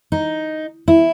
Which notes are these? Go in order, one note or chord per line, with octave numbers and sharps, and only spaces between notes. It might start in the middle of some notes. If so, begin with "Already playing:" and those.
D#4
E4